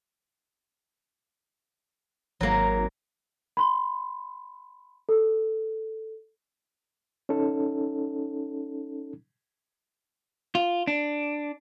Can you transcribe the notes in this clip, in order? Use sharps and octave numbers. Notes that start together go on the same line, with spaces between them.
G#1 F#3 A#3
B5 C6
A4
C#4 D#4 A4
F4
D4